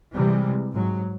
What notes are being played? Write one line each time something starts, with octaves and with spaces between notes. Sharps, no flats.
C3 E3 G3 G#3
G#2 F#3